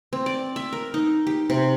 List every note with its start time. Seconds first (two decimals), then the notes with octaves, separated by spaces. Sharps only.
0.13 C4
0.26 D5
0.56 E5
0.72 A#4
0.94 D#4
1.27 G4
1.50 C3